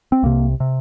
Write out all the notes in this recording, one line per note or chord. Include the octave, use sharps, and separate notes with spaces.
C4
C2 C3 A#3
C3